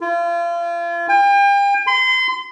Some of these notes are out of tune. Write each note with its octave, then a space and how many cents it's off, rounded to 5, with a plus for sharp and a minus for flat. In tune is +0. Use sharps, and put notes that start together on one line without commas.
F4 -35
G5 +40
C6 -35